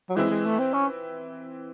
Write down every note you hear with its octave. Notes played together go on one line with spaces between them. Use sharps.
F#3
E3 G#3 C4 E4
G#3
A3
C4
C#4